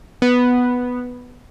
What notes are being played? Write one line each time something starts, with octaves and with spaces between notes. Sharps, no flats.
B3